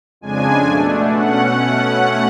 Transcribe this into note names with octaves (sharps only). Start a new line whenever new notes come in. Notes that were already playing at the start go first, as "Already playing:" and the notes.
F2 C#3 G#3 D4 G#5
B2 A3 D4
B2 A3 C#4 F#5